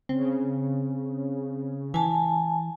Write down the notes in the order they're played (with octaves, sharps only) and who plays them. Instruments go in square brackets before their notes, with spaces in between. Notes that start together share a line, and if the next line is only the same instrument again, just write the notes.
[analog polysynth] C#3 [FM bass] C4
[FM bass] E3 [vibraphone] G#5 A5